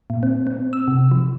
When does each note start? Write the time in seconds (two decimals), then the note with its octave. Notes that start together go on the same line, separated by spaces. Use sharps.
0.10 A#2
0.23 C4
0.47 C4
0.73 E6
0.88 C3
1.11 F3